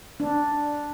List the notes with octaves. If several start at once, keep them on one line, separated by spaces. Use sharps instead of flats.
D4